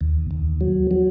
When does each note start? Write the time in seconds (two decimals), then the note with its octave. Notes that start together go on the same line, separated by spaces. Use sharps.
0.01 D#2
0.31 D#2
0.61 F#3
0.91 F#3